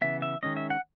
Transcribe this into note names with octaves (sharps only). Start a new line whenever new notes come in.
C#3 E3 B3 E5
E5
D#3 G#3 C#4 D#5
E5
F#5